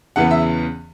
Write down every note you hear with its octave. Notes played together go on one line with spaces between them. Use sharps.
E2 C#3 E3 B3 F#5
E5